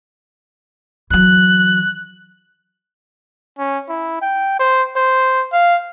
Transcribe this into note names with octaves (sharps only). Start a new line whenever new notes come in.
E3 F#3 F#6
C#4
E4
G5
C5
C5
F5